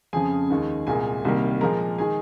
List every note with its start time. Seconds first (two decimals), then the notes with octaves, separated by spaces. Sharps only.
0.13 F2 C#3 F3 G#4 G#5
0.50 D#2 D#3 G#3
0.87 C2 A#2 G#3 G#4 G#5
1.25 C2 C3 D#3 G3 A#3
1.61 A#2 F3 G#3 A#4 A#5
1.98 D#3 G#3 G#4 G#5